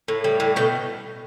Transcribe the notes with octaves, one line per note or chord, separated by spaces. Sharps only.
A2
G3
A2
B2 G5